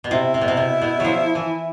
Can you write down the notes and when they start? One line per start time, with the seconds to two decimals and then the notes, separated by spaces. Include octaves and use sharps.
0.04 B2
0.11 C3 E4
0.34 C3
0.41 B2
0.48 C3
0.57 B2
0.82 B2
1.00 F3 F#3
1.35 E3